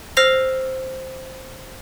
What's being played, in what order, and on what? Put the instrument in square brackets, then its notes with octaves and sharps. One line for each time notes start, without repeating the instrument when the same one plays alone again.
[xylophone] C5 E6 F6 A#6 C7 F7